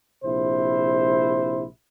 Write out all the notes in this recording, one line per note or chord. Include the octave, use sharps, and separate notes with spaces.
A#1 C3 E4 C5